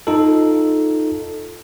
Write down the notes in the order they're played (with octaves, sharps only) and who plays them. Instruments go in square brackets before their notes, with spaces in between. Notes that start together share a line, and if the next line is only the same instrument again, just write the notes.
[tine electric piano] D#4 F4 A4